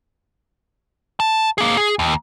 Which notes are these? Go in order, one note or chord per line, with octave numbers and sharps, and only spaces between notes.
A5
A#3 G#4
G#4
D#2